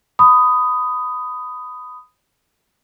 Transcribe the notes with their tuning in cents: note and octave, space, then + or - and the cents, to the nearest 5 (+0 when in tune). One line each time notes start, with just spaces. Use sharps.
B5 +20 D#6 +0